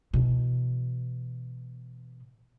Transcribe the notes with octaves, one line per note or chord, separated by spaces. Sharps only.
B2 E3